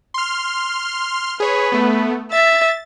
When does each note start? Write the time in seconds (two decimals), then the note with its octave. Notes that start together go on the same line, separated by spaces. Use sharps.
0.14 C6 F6
1.40 G#4 B4 C#5
1.72 A3 B3
2.32 E5 A6